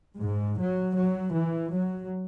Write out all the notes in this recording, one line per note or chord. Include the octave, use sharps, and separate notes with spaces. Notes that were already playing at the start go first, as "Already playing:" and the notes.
G#2
F#3
F#3
E3
F#3